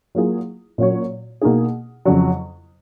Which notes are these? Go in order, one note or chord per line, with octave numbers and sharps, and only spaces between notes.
F#3 A#3 F4 G#4
A#2 F#3 C#4 F#4 C#5
B2 A#3 D#4 G#4
F2 C#3 F#3